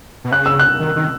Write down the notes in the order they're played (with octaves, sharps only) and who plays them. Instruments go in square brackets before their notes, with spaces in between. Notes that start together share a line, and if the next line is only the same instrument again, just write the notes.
[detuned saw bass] B2
[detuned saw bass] C#3 [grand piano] F#6
[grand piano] E6
F#6
[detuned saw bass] D#3
D#3